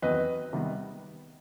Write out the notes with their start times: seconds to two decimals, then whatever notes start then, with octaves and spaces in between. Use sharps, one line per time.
0.02 E2 D#3 F#3 C4 B4 D#5
0.53 C3 D#3 G3 B3